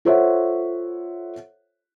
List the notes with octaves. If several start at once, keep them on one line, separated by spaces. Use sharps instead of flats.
F4 A4 C5 C#5 E5 F#5